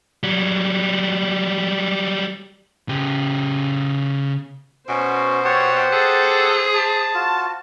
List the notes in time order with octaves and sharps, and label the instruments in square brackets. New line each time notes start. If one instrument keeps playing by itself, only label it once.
[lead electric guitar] F#3 G3
C#3 G4
[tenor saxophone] B2 [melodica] C#4 F#4 [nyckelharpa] C5
[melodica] G4 F#5 A5 [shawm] C#5
[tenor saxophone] G#4 [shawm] A4
[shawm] A5
[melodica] F4 F#4